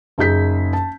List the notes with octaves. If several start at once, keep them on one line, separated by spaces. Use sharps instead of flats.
F#1 D#4 G#4 G6 B6
A5